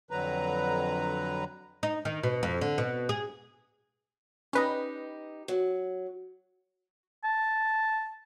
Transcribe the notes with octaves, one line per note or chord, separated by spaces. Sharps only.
F2 D3 F#3 B4 A#5
D#4
D#3
B2
F2
D3
B2
G#4
C#4 D#4 G4 B4 D#5
F#3
A5